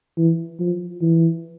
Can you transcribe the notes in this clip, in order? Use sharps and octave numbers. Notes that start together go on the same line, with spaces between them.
E3
F3
E3